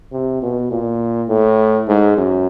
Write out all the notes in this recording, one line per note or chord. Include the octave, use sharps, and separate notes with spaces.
C3
B2
A#2
A2
G#2
F#2